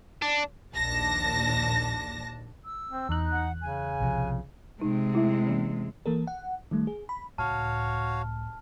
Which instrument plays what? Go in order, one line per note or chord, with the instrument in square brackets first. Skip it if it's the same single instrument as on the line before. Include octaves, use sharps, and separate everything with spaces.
[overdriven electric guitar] D4
[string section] A#1 D#2 D4 A5 A#6
[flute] E6
[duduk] C4
[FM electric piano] E2 F#6 [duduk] D#4
[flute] F#5
[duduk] C#3 [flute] G#5
[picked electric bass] B1 C3 F3
[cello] C3 G#3 [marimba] D#4
[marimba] A3 E4 E5
E3 A#3 C#4
[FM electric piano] E3 A#3 A4 A#4
F#5
D#3 G3 A3
G#4
B5
[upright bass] C#2 A2 [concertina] F#4 C#5 F5 [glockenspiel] A5 F6